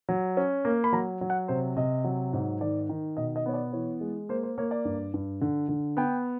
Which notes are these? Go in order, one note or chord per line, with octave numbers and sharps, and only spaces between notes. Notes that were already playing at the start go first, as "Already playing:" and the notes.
F#3
C#4
A#3
B5
F#3 A#5
F#3
F#5
C3 C5
C3 D#5
F#3
G#2
D#3 D5
D#3
B2 D#5
D#5
B3 C#5
D5
E3 C#5
G#3
A#3 C5
C5
A#3 C#5
D5
G2
G2
D3
D3
B3 G5